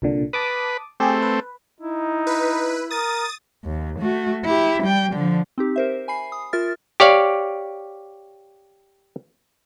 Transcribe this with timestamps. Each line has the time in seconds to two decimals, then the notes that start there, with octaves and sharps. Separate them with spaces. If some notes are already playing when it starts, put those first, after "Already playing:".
0.02 C2 A#2 D3
0.33 B4 A5 D6 D#6
1.00 A3 C4 G4 G#4
1.22 B4
1.81 D#4 E4
2.27 B4
2.91 A#4 D#6 A6
3.65 D#2
3.99 A3 F#4
4.45 E4 G4
4.83 G3 G5
5.13 D3 F3
5.58 C4 D#4 G4
5.76 A#4 C5 E5
6.08 G#5 B5 C7
6.32 D#6
6.53 F4 A#4 E5 F6 A6
7.00 G4 C#5 D5 F5